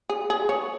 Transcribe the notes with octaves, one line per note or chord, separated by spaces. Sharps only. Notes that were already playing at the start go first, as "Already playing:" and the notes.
G#4
G#4
C#5